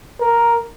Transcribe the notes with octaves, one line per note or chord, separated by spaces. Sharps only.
A#4